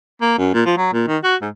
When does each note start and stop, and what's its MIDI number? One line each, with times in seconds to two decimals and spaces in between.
0.22 0.34 58
0.38 0.50 42
0.54 0.62 46
0.66 0.75 53
0.77 0.91 54
0.93 1.07 46
1.08 1.18 51
1.24 1.35 66
1.42 1.49 44